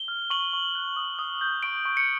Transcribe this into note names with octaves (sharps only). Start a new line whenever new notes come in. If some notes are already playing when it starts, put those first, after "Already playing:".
Already playing: G7
F6
C#6 F#7
C#6
F#6
D#6
D#6
G6
C#6 D7
C#6
C#7